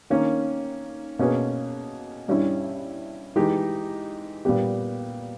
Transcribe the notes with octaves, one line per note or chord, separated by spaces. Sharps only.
D#3 A#3 C#4
B2 A#3 C#4 G#4 B4
G2 G3 C#4 E4
E3 G#3 D#4 G4
A#2 G3 B3 G4